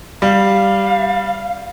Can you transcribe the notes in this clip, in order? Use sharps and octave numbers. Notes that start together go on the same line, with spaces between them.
G3 F5